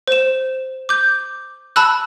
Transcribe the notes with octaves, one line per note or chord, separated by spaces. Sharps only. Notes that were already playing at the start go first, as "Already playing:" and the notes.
C5 E7
D6 G6
A5 B5 E6 F#6